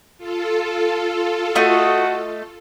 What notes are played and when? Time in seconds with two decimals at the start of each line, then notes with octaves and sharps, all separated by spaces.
0.18 F4 A4
1.55 A3 F#4 D#5